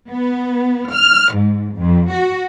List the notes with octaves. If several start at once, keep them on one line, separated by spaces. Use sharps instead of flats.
B3
F6
G#2
F2
F#4